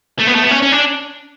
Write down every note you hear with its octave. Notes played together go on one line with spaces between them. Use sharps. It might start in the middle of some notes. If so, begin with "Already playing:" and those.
A3
B3
A3
B3
C#4
C#4
D4